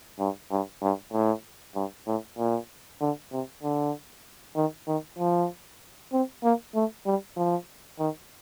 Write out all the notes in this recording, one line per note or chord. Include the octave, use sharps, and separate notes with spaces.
G2
G2
G2
A2
G2
A2
A#2
D3
C3
D3
D#3
D#3
F3
C4
A#3
A3
G3
F3
D#3